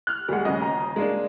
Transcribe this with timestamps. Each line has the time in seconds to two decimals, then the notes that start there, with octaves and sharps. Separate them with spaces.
0.07 F6 F#6
0.28 D2 G3 G#3 F#5
0.45 D#1 C#3 D#5
0.61 A#5
0.96 G#3 A#3 D4